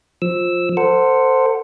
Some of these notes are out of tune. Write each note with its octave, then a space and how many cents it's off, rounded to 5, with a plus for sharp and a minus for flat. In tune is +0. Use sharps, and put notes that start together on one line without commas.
F3 +15 E6 -5
A4 +30 C5 -5 F#5 +0